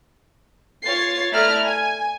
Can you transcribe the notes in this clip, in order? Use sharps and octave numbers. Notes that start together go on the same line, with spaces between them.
F4 C#5 A6 C7
A3 E4 D5 A#5 F6
G#5